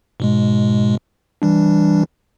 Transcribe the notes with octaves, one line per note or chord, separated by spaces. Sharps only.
G#2 B2 G#3
E3 G3 D4